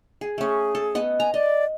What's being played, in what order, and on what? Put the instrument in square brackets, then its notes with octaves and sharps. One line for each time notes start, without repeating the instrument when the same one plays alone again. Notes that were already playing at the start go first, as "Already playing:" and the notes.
[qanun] G#4
[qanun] A3 C#4 [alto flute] G#4
[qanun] A4
B3 D#5
[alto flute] G#5 [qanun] A#5
[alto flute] D5 [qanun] D#5